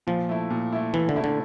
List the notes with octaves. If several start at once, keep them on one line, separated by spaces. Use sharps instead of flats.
A#2 F3
A3 E4
A#2
A3 E4
A#2 E3
D3
A3 E4
D3